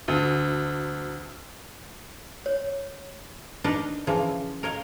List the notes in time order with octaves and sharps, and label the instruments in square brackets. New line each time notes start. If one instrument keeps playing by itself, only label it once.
[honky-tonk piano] D2
[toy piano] C#5
[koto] D4 D#4 A#4 B4 D#5
C#3 E3 F3 A#3
A#4 C#5 D#5 F5